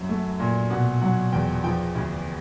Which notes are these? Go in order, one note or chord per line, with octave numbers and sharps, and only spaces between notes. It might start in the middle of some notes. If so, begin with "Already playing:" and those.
Already playing: F#2 F#3 F#5
A3
A#2
B2 F#5
F#3 F#5
E2 G5
F3 G5
D2